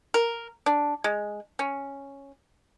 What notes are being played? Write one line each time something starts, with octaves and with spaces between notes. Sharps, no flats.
A#4
D4
G#3
C#4